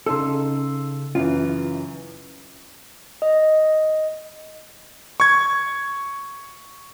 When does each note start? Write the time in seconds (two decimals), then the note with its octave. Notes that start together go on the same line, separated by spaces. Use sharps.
0.06 C#3 D#4 A4 C6 E6
1.15 F#2 C#3 E3 F4
3.22 D#5
5.20 C#6 G#6